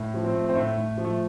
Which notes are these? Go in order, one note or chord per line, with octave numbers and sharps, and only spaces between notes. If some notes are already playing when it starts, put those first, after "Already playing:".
Already playing: A2
F3
C4
A3
C4
A2 A3
A2
F3
A3